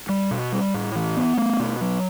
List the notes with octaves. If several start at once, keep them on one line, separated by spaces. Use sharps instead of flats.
G3
B2
G3
A2
E3
B3
A3
B2
F#3